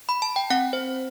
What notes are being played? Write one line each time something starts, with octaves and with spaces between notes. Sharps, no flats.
B5
A5
G5
C4 F#5
C5